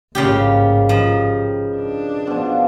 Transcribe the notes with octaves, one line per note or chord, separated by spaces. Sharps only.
A1 G#2 C#3 G3 A#3 F4 G4
F3 D#4 G4 B4
D4
B2 F3